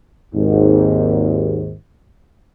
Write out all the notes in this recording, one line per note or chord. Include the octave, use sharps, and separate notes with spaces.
G#1 D#2 G#2